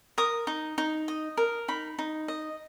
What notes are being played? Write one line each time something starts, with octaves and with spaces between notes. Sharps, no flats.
A#4 D#6
D#4
D#4
D#5
A#4
D#4 B5
D#4
D#5